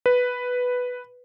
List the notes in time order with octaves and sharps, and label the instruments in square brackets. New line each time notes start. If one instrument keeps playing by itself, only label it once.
[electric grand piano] B4